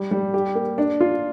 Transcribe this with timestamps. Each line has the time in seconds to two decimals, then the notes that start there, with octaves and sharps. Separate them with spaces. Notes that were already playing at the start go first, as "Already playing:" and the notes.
Already playing: G3
0.11 G3
0.34 G4
0.55 A#3
0.78 D4
1.00 F4